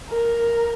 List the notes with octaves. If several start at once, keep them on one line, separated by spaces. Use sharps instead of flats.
A#4